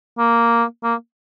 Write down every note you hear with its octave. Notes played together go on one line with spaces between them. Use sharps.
A#3
A#3